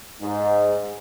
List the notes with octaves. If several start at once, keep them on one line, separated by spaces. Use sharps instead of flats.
G#2